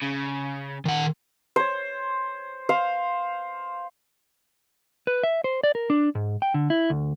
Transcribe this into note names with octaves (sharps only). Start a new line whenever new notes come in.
C#3
D#3 F#5
C5 C#5
C5 F5
B4
E5
C5
D5
A#4
D4
G#2
G5
D3
E4
D2